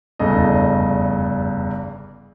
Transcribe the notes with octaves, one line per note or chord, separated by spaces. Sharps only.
F1 E2 G2 C#3 A4 D#5